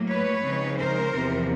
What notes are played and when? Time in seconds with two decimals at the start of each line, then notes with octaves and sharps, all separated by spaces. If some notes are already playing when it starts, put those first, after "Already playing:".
Already playing: A2 F#3 A#3
0.09 B4 C#5
0.44 C#3 F3 G#3 C4 D#4
0.79 A#4 C5
1.14 E2 C3 F3